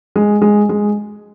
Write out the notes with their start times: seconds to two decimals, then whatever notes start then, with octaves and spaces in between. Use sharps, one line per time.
0.16 G#3
0.42 G#3
0.69 G#3